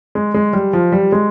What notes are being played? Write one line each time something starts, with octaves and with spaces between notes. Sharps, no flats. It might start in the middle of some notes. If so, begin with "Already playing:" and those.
G#3
G#3
G3
F3
G3
G#3